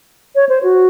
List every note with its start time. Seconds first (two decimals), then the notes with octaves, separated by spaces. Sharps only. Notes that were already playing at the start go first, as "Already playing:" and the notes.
0.35 C#5
0.49 C5
0.63 F#4